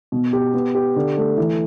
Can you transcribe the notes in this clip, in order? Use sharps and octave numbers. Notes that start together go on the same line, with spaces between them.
B2
G4
B3
G4
D3
A3
E3